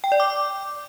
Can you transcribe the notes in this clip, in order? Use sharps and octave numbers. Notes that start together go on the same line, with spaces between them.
G5
D5
D6